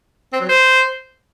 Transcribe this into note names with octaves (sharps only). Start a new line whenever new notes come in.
C4
F#3
C5